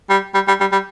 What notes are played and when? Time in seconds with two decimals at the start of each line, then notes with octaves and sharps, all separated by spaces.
0.09 G3
0.34 G3
0.48 G3
0.60 G3
0.72 G3